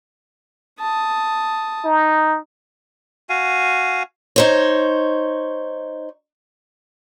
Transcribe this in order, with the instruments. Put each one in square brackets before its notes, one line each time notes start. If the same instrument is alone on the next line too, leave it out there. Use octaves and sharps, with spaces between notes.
[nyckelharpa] A5 D#6
[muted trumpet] D#4
[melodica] F#4 F5 G#5
[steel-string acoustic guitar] D#4 C5 C#5